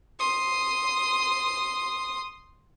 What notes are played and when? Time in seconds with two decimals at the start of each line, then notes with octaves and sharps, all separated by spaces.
0.19 C6 D#6